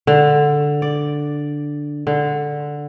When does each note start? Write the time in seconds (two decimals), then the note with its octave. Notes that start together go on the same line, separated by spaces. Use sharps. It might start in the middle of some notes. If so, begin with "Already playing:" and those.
0.07 D3
0.82 D5
2.07 D3